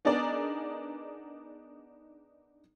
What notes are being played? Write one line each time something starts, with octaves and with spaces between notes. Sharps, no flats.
B3 D4 D#4 G#4 A#4 D5